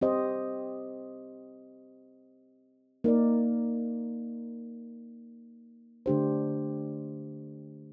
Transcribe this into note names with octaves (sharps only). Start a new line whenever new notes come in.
C4 G4 C5 D#5
A#3 D#4 A#4 D5
D3 A3 D4 G4 C5